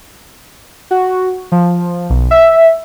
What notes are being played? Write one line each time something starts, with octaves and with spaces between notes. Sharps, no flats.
F#4
F3
B1
E5